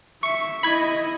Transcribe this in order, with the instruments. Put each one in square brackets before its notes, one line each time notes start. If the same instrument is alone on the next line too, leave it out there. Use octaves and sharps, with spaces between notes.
[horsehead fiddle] E5 [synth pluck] C#6 C#7
[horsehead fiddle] E4 D#5 [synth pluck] B5 G#6